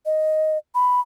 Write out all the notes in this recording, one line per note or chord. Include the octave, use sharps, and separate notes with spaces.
D#5
B5